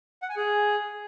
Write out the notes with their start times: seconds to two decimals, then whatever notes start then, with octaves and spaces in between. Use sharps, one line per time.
0.22 F#5
0.29 G#5
0.36 G#4